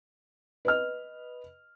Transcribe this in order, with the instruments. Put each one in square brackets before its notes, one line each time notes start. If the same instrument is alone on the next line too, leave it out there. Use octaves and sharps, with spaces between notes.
[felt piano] B4 D#5 F6